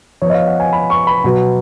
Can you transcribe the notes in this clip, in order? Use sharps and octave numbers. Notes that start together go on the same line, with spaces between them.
F3 B3 C#5
D#5
F5
F#5
G#5
B5
C#6
B5
B2 F#3 B3